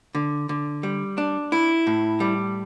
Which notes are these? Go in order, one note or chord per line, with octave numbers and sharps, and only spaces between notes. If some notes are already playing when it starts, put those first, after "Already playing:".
D3
D3
G3
D4
E4
A2
G3